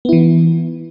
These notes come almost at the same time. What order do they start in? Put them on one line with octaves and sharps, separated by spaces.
B3 E4 E3